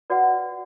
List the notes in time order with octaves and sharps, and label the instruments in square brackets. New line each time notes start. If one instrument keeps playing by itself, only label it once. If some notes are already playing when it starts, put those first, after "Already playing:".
[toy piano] F#4 B4 D5 F#5